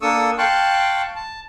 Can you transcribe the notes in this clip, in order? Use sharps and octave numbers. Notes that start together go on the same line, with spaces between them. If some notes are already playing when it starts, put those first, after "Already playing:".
A#3 D4 A4 C#6 D#6 E6
F5 G5 A5 C6 C#6 F#6
A5